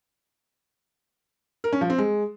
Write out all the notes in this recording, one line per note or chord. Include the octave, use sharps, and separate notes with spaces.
A#4
C#4
F3
C4
G#3